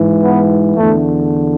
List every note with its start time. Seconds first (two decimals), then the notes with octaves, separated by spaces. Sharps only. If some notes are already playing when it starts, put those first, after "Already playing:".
Already playing: G#2 E3
0.24 B3
0.77 E2 D3 A3